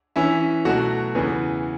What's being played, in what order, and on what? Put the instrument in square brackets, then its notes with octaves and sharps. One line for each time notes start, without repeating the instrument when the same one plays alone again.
[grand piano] E3 C#4 E4
B2 F#3 A3 F#4
E2 C#3 E3 B3